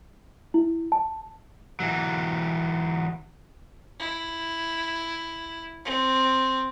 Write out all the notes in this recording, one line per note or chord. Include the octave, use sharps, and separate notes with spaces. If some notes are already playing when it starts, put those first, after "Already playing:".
E4
A5
E3 F#3
E4
C4